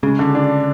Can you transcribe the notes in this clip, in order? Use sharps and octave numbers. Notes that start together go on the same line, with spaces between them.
C#3 G#3
D3
D4